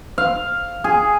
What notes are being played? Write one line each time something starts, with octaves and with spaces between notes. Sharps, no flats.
F5
G#4